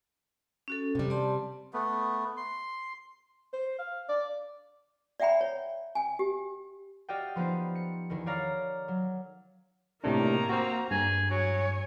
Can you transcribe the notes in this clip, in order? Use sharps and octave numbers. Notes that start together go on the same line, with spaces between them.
C#4 F#4 A4
C3 G3
D5 A5 C6
A3 B3
C6
C5
F5
D5
D5 E5 F#5 G5 A#5 B5
C#5
G5 G#5
G4
F#4 G4 D5 D#5 F5 G5
F3 B3 D#4 C5
C#7
E2 D#3
C#5 D5 F5 A#5
F#3
A2 C3 D#3 A#3 D4 A#5
C4 F#4 C5
G2 G#4
F#3 C#5 G#5